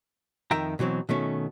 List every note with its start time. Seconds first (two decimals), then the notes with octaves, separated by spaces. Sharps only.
0.51 F2 D#3 E5 G5 A#5
0.79 B2 E3 F#3 C4
1.09 B2 D#3 A3 C#4